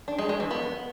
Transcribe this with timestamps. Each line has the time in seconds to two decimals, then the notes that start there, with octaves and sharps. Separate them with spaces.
0.08 D4
0.19 G#3
0.29 G#3
0.40 E3
0.51 B3